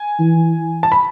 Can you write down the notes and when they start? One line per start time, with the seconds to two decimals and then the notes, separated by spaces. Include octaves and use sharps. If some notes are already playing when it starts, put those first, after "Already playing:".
Already playing: G#5
0.19 E3
0.83 A5
0.92 B5